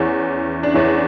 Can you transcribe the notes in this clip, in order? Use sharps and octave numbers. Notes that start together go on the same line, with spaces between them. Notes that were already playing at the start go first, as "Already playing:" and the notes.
Already playing: E2 E3 C#4
D4
E2 E3 C#4